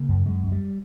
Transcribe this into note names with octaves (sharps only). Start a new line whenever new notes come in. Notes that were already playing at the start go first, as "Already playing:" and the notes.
Already playing: C#3 A#3
F#2
F#2 G#3
F#2
G3